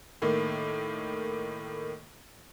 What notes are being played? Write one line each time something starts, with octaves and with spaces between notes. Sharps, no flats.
A2 D#3 A#3